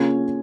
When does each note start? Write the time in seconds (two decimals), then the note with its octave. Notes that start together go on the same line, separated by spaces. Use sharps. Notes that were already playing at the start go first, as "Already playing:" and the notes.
Already playing: C#3 A#3 C#4 F4 G#6